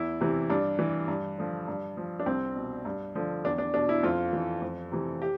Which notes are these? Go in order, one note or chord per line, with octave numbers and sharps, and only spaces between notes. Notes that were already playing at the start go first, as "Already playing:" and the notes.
Already playing: E2 E4
C3 E3
G2 D4
E3
G2
D3 F3
G2
F3
D4
C2 C4
B2
G2
D3 F3
E2 D4
D4
B2 D4
E4
F2 F4
E3
F2
C3 E3
G4